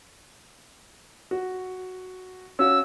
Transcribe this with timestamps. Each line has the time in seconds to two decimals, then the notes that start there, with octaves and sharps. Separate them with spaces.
1.31 F#4
2.59 C#4 F#4 F5 E6